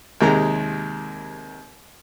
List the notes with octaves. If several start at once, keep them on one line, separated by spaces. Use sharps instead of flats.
D#2 C3 D#3 G#3 A#5